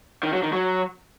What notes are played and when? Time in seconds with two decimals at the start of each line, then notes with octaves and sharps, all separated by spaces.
0.23 D#3
0.33 F#3
0.43 D#3
0.53 F#3